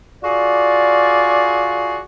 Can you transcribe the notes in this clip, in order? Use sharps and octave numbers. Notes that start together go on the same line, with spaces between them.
F4 F#4 G#4 D5